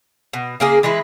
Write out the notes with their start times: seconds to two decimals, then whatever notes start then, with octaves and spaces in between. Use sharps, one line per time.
0.33 B2
0.60 C#3 A#3 G#4
0.83 E3 G#3 E4 B4